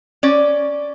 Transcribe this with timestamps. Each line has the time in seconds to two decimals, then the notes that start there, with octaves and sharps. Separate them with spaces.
0.23 C#4 D5